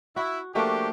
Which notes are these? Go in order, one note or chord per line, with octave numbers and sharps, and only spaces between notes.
E4 F#4
F3 A3 A#3 D4 F#4 G4